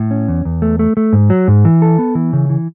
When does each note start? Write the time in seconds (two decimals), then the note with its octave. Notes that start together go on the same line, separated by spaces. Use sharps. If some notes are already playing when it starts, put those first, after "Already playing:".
Already playing: A2
0.11 C#4
0.28 E2
0.45 E2
0.62 A3
0.79 A3
0.97 A3
1.13 G#2
1.30 F#3
1.48 G#2
1.65 E3
1.82 A4
1.99 B3
2.15 E3
2.33 C#3
2.49 E3